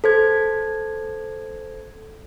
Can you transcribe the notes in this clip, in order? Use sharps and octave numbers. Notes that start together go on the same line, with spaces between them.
A4 C5 G#6